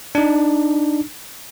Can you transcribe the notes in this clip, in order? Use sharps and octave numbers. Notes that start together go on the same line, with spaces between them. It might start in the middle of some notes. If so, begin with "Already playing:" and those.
D4 D#4